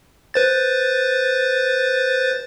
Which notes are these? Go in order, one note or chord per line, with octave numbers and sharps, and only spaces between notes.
B4 C5 A6